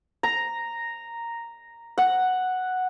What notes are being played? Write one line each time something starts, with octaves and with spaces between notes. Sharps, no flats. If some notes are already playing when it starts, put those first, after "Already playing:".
A#5
F#5